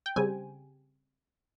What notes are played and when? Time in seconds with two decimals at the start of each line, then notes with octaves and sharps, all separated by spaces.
0.06 G5
0.16 C#3 G3 C4 G#5